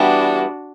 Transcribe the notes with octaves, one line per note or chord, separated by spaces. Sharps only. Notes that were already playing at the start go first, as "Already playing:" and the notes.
Already playing: E3 G3 B3 D4 F#4